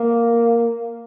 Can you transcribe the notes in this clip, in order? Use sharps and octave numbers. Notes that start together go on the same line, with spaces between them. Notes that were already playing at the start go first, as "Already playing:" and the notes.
Already playing: A#3